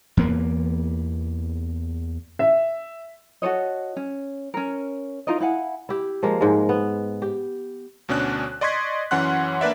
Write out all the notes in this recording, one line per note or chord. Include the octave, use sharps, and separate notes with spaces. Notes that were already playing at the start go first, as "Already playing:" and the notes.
E2 A#3
E5
F#4 A4 C#5 D#5
C#4
C#4 A#4
D#4 F4 A#4 D#5
E4 F5 F#5 G#5
E4 G4
F3 G#3 A#3
G#2 G#3
B3
G4
D2 B2 C#4 D4 F#6
D5 D#5 C6 C#6 G#6 B6
F#2 E3 C#4 F#5 C6 F#6
A#3 D4 B4 D5 E5